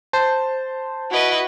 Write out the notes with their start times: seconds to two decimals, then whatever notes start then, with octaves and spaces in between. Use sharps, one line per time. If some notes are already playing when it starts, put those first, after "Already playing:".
0.13 C5 A5
1.11 E4 F#4 B4 D#5